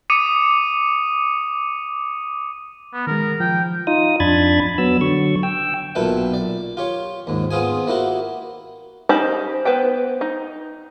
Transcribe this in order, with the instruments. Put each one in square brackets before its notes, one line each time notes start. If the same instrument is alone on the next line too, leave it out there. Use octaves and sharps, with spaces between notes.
[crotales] D6 D#6 C#7 D#7
[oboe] B3
[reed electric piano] D#3 G#3 [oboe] A#4
[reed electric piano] F3 [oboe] G5
[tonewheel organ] D#4 F4 D#6
F2 D4 B5 G#6 A6
F#3 B3 E6
D3 F#3 C#6
G5 E6
[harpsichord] B1 A#2 A4 B4 E5
D5
F4 G4 C#5
D#2 G#2
B3 C4 F4 G#4 G#5
A#3 E4 F#4 G4
[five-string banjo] C#4 D#4 G4 C5 B5
B3 B4 C5 G5
D#4